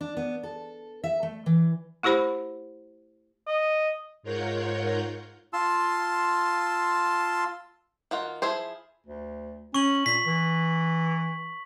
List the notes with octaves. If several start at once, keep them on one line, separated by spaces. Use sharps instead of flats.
D4
B3
A4
E5
A3
E3
A3 E4 G4 C5 B5
D#5
G#2 F4 A#4 C#5 F#5 G6
F4 A5 C6 E6
D#3 F4 F#4
F3 E4 G#4 C5
D2
C#4 C#6 F#7
A#2 B6
E3